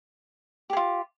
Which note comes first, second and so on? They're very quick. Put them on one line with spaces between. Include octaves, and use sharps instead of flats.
G4 G#4 F4